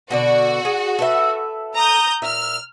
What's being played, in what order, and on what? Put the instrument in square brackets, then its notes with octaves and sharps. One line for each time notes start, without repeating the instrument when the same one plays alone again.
[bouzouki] B2 D3 D5 [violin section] F#4
[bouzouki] G#4
A4 B4 E5
[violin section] A#5 D#6 G6
[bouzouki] A#2 E5 [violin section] F6